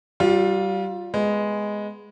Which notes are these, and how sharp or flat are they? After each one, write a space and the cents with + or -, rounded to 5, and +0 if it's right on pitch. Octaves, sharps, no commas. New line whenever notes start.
G3 -30 F4 +15
G#3 +0 B3 +0